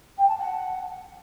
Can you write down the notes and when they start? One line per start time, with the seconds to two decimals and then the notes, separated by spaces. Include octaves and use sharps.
0.17 G5
0.28 A5
0.38 F#5